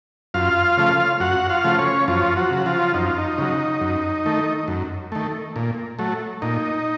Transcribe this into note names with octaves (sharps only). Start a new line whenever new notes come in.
F#2 F4 F5
C#3 F3 A3
F#2 F#4 F#5
F4 F5
C#3 F3 A3
C#4 C#5
F#2 F3 F4
F#3 F#4
C#3 F#3
F3 F4
F#2 D#4
F4
D#4
C#3 F#3
F#2
D#3 A3
F#2
D#3 A3
A#2
F#3 A3
A#2 D#4